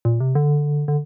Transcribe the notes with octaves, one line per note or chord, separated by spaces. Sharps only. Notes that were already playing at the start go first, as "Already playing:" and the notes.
A#2
C3
D3
D3